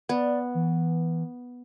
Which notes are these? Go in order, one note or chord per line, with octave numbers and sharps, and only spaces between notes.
B3 D5
E3